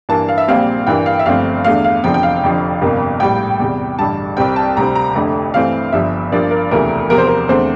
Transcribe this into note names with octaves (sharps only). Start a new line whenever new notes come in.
G2 E3 A#3 D4 A5
F5
E5
A#1 A#2 G3 C4 F5
G2 E3 A#3 D4 G5
F5
E5
G1 G2 F3 A3 C4 F5
E2 D3 A3 F5
F5
F1 E2 D3 F3 C4 G5
G5
F5
F1 F2 D3 F3
G1 F2 C3 G3 A#3
A#1 A2 G3 G5
E2 C3 G3
A1 G2 D3 G3 A5
C2 C3 G3 C4 G5
A5
D2 C3 G3 C4 A#5
A#5
F1 F2 D3 A3
G2 E3 A3 C4 F5
G1 G2 F3 E5
G2 F3 A#3 D4 D5
A#4
E1 D2 C3 E3 A3 A#4
E2 C3 F3 A#4
C5
A#4
E2 D3 A3 C4 C5